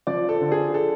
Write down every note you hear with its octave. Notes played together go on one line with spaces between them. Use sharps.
F3 D5
A4
D3
G#4
A4